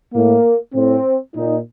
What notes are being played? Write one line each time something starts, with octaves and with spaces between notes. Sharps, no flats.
A2 A#3
A2 C4
A#2 D#4